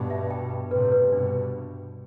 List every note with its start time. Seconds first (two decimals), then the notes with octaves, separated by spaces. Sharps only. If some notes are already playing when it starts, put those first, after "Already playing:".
Already playing: G2 B2
0.10 E5
0.31 G5
0.50 B5
0.71 A2 C3 B4
0.92 B4
1.12 G2 B2 D4